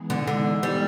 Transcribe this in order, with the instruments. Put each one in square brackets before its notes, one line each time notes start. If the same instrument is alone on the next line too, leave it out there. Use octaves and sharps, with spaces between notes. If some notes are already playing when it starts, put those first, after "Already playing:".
Already playing: [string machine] E3 G#3 B3 D#4 G#4
[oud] D3
D3
G3